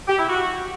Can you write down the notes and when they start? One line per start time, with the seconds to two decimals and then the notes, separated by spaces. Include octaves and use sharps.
0.08 G4
0.18 E4
0.28 F#4